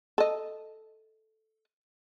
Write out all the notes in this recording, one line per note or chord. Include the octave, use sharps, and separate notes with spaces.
A4 D#5